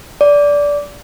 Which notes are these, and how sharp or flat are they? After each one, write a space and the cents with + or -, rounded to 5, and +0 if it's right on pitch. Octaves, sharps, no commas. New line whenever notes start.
D5 -15